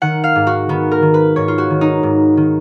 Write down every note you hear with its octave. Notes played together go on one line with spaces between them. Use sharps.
D#3 F#5
F5
G#2
F#4
D#3 B3
A#4
D#3
B4
G#2 C#5
F4
F#4
D#3
D#4
G#2
D#3